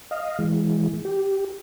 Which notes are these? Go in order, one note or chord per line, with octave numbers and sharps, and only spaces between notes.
D#5 F5
E3 G#3
G4